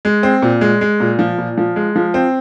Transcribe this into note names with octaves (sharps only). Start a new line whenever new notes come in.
G#3
C4
A#2
G#3
G#3
A#2
F3
A#2
F3
G#3
F3
C4